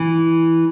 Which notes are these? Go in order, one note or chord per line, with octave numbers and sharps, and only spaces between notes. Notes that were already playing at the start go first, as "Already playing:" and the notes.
Already playing: E3